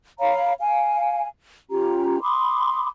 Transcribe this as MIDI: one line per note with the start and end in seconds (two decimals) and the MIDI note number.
0.19 0.52 73
0.19 0.52 77
0.19 0.52 82
0.19 0.52 83
0.60 1.28 77
0.60 1.28 80
1.70 2.22 61
1.70 2.22 65
1.70 2.22 67
1.70 2.22 82
2.22 2.88 83
2.22 2.88 84
2.22 2.88 86
2.22 2.88 87